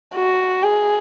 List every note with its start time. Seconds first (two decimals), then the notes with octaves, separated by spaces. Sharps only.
0.16 F#4
0.64 G#4